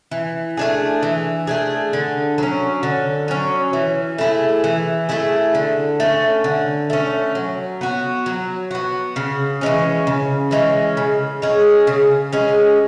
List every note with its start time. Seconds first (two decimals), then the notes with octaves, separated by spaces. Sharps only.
0.11 E3
0.57 A3 D4 G#4
1.03 E3
1.47 A3 D4 G#4
1.93 D3
2.38 F#3 C#4
2.83 D3
3.28 F#3 C#4
3.73 E3
4.18 A3 E4 G#4
4.64 E3
5.09 A3 E4 G#4
5.55 D3
6.00 A3 C#4
6.44 D3
6.90 A3 C#4
7.35 F#3
7.81 B3 F#4
8.26 F#3
8.71 B3 F#4
9.16 C#3
9.61 E3 G#3 C#4
10.07 C#3
10.51 E3 G#3 C#4
10.97 C#3
11.42 G#3 C#4 G#4
11.87 C#3
12.33 G#3 C#4 G#4